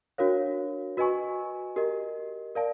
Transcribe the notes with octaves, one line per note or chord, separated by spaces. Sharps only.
D4 F#4 A#4 C#5 F5
F#4 B4 D#5 G#5 C#6
G4 A#4 D#5
A#4 D5 F5 A5